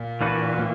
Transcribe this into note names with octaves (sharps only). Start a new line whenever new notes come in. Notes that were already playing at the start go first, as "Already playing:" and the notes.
Already playing: A#2
E3 A#3 D4 F#4 B4
E3 A#3